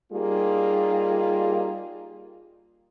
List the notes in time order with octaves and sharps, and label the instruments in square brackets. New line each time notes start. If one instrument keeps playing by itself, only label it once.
[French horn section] G3 A#3 D#4 F4 G4 G#4